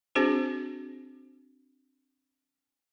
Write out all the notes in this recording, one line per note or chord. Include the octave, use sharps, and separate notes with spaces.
C4 D4 F#4 G#4 C5